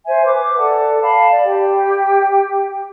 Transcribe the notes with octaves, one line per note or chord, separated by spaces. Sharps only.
C5 E5 G#5
B4 D6
A4 D5 F#5 A5
F5 A5 B5
D5
G4 G5